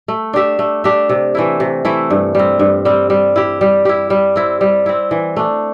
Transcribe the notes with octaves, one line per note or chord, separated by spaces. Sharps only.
A3
D4 G4 E5
A3
D4 G4 E5
C3
E3 A3 E4
C3
E3 A3 E4
G2
G3 C4
G2
G3 C4
G3
E4 G4
G3
E4 G4
G3
C4 E4
G3
C4 E4
E3
A3 D4